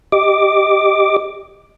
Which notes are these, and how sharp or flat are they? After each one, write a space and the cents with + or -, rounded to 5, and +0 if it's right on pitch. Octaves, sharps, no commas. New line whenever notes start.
G4 +0 D#5 +0 D6 +0